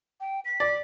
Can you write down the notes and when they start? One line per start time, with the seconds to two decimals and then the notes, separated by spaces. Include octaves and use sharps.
0.21 G5
0.45 B6
0.60 D5